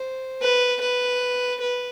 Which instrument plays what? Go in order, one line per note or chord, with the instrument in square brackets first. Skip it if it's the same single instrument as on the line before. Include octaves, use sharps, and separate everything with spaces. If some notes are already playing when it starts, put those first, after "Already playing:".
Already playing: [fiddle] C5
B4
B4
B4